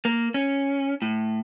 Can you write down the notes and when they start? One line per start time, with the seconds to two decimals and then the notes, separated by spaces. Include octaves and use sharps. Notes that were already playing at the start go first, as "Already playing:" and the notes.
0.05 A#3
0.34 C#4
1.02 A2